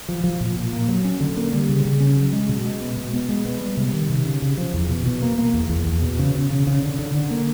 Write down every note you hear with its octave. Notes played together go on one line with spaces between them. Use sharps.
F3
F3
A#2
A#2
A#3
F#3
C#4
D3
A#3
G3
C#3
C#3
C#4
F#3
G#3
B2
G#3
B3
B2
B3
G#3
B3
G3
C3
D#3
C3
C#3
C#3
F3
E2
B2
B2
A#3
A#3
E2
E2
E2
B2
C#3
C#3
C#3
C#3
D3
D3
D3
A#3